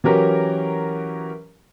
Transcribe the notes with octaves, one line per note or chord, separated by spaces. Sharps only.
E3 F#3 C#4 G4 A#4